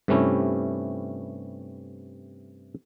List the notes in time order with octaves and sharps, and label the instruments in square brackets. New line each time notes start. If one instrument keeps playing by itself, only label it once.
[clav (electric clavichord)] G2 C3 G3 A3 C#4 E4